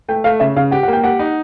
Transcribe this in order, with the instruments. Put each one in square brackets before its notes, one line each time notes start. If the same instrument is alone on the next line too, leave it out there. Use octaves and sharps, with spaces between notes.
[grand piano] A3 [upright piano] G5
[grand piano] A3 [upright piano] F5
[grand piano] C#3 [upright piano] E5
[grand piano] C#3 [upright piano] F5
[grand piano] G4 [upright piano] F#5
[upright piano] F#5
[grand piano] A#3
[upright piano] G5
[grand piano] G4 [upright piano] F#5
[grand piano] D#4